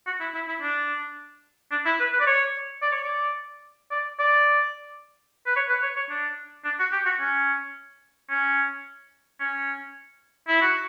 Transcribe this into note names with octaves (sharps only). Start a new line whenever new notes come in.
F#4
E4
E4
E4
D4
D4
E4
B4
B4
D5
C#5
D5
C#5
D5
D5
D5
B4
C#5
B4
C#5
C#5
D4
D4
F#4
G4
F#4
C#4
C#4
C#4
E4
F#4